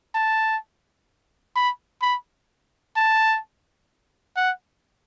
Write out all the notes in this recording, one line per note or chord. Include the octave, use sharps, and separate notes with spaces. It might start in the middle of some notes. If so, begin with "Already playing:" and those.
A5
B5
B5
A5
F#5